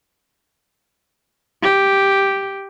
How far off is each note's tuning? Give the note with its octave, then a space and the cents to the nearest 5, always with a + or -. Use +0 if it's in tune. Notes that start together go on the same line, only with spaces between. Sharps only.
G4 +0